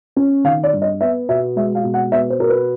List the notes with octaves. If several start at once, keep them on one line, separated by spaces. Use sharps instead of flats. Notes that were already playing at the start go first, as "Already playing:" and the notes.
C#4
D#3 F5
D5
G2
D#5
B3 E5
B2 E5
G#3 E5
F5
B2
F#5
B3 E5
C5
B2 A#4
B4